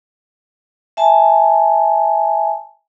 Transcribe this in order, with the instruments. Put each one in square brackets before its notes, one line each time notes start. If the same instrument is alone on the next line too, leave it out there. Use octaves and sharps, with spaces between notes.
[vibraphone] E5 G#5 A5